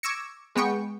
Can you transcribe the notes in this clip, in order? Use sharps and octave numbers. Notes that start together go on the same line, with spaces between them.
C#6 D6 E6 G#6 A#6 C#7
G#3 B3 G5 C#6